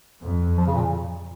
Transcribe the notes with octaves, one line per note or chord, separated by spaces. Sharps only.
F2
F3
C#3
A#2